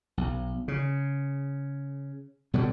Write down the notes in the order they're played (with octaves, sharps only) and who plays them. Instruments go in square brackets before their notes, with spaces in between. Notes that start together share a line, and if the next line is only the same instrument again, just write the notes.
[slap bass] B1
C#3
B2 D3 F#3 G3